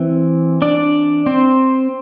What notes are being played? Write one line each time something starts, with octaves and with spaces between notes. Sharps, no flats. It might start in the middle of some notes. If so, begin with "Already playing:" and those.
Already playing: E3 C4
D4 D5
C4 C5